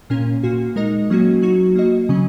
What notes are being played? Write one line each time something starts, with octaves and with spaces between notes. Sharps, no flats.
A#2 A#3 C#4 A#4
A#2 A#3 F#4
G#3 D#4 A#4 D#5
F#3 A#3 C#4 F#4
F#3 D#4 F#4
A#3 F#4 D#5
C#3 F#3 C#4